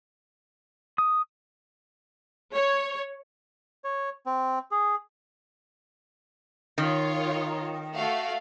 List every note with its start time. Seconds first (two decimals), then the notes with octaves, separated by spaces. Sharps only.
0.98 D#6
2.54 C#5
3.84 C#5
4.26 C4
4.71 G#4
6.78 D#3 F4 C#5
7.94 A3 F#4 F5